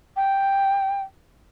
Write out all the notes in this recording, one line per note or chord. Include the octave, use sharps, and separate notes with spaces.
G5